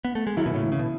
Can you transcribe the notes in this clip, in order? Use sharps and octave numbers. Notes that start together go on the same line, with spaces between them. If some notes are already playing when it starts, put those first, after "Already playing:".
B3
A3
G#3
D#3 F#3 E4
B2
A2 C#3
E3
C#3
B2